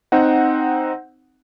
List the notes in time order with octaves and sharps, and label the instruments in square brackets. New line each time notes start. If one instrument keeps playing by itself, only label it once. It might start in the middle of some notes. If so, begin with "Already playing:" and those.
[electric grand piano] C4 D#4 F#5